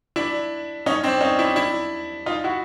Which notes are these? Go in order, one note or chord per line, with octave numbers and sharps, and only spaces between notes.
D4 E4
C#4 D#4
C4 D4
C#4 D#4
D4 E4
D4 E4
D#4 F4
E4 F#4